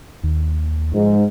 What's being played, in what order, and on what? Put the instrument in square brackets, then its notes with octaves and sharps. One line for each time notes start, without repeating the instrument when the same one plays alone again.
[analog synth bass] D#2
[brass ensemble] G#2 [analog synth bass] F3